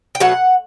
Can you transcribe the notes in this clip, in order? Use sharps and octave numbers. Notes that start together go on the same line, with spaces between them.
G5
B2 F#3 A3 F#5